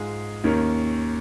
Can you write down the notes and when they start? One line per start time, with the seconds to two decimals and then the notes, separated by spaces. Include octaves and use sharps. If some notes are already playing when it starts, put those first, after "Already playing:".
Already playing: G#2 G#3 F4 G#4
0.44 D#2 D#3 C#4 A#4